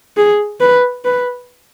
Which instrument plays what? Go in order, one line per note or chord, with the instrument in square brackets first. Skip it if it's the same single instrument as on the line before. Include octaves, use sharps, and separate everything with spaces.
[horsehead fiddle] G#4
B4
B4